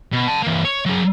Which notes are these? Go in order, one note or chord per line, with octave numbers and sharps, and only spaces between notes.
B2
F#5 A5
E3 A#3
C#5
F#3 G#4